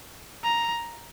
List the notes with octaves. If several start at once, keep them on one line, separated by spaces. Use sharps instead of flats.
A#5